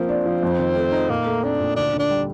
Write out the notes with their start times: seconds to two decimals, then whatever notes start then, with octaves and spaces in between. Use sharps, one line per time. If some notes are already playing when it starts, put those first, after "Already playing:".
Already playing: F3 A#3 C4
0.09 D4
0.26 F3
0.43 F2
0.59 D#3
0.76 A3
0.92 D#4
1.09 A#2 A#3
1.26 A3
1.43 C4 D4
1.59 A#2
1.76 D2 D4
1.94 D3
1.99 D4
2.10 G3